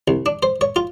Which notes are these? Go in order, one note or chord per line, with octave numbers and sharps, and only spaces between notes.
C2
D4
C5
C#5
F4